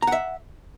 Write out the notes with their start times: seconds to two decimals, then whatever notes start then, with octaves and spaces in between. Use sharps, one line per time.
0.02 A#5
0.07 F#5
0.12 E5